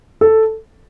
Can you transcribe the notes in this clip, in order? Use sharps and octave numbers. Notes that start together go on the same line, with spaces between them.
A4